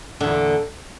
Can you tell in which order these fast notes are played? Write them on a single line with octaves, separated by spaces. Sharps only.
D3 E2 A#2